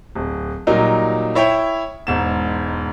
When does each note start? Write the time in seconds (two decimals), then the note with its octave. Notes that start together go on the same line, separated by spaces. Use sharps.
0.15 D1
0.67 A#2 F#3 G3 D#4 A#4
1.35 E4 C#5 E5 G5
2.07 E1 G#2 E7